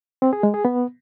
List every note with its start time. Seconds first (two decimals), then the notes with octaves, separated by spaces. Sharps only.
0.22 C4
0.33 G#4
0.43 G#3
0.54 G#4
0.65 B3